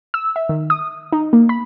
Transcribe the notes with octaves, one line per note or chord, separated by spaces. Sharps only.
E6
E5
D#3
D#6
D#4
A#3
B5